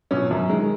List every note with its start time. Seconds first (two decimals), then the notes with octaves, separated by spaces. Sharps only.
0.11 B2 F#3 C#4
0.31 F#2
0.49 D#3 G#3